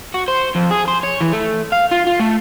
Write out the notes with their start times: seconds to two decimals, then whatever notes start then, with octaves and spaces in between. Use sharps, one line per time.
0.14 F#4
0.28 C5
0.55 F2
0.71 G#4
0.88 C5
1.03 C#5
1.21 E3
1.33 A3
1.72 F5
1.92 F4
2.07 F4
2.20 A3